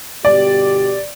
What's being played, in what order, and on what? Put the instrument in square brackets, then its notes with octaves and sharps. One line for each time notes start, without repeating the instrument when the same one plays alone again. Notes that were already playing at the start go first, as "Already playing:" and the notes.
[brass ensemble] G1 B2 G4 [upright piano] D5